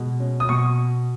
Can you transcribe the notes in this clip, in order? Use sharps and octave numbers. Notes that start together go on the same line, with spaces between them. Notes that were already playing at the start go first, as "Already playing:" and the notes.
Already playing: B2 G#3
C#4
D#6
B2 C#6